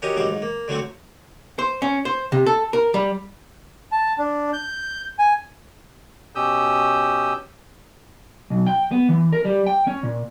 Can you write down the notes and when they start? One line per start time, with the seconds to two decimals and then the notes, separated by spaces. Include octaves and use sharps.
0.02 C#4 F#4 G4 A#4 C#5 D#5
0.16 A#1 G#2 F#3 G3 F5 D6
0.29 G#2
0.42 A#3
0.68 D3 F#3 A3 C4 C#6
1.59 C5
1.82 C#4
2.05 C5
2.32 C3
2.46 A4
2.73 A#4
2.94 G3
3.92 A5
4.18 D4
4.53 G6
5.19 G#5
6.35 B2 C#4 G4 D#6 E6 G6
8.50 B1
8.66 G5
8.91 B3
9.09 E3
9.32 A#4
9.45 G3
9.67 G5
9.87 C#4
10.03 A#2